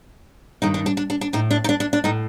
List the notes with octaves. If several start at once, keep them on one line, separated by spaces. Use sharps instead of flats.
G2 D#3 D#4
D4
D4
D4
D4
D4
A2 D#4
D4
D#4
D4
D4
D4
A2 D#4